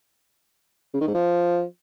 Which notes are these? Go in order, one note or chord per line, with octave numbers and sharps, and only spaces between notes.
C#3
D#3
G#2
F3